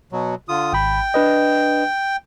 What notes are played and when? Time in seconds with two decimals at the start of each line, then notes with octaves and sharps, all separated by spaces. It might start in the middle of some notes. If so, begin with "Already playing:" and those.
0.12 B2 F#3
0.49 D3 F4 D#6
0.73 G#1 G5 B5
1.14 D4 B4 D#5